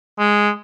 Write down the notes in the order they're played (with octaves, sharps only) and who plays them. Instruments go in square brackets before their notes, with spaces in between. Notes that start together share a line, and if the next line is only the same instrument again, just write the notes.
[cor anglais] G#3